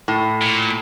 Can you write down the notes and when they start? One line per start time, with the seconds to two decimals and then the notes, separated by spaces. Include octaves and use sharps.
0.08 A2
0.41 A#2